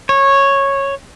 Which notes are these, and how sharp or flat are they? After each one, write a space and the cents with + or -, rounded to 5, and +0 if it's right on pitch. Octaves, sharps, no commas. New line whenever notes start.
C#5 -10